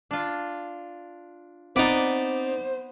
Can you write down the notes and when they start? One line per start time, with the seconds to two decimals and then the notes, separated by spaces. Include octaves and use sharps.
0.11 D4 F4
1.76 B3 C4 D#4 C5 D5